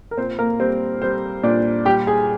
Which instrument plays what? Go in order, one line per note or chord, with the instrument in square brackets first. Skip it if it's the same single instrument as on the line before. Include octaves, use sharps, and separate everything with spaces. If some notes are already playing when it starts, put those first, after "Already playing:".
[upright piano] A#4
A#2 C4 C5
A#3 A#4
G3 C4 C5
G3 C4 C5
A#2 D4 D5
G3 G4 G5
G#4 G#5